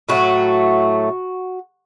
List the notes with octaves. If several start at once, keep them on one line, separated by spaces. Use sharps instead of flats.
A2 F#3 A3 F#4